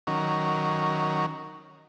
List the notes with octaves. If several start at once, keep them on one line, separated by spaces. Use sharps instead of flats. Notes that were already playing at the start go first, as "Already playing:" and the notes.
D#3 F#3 C#4 A#4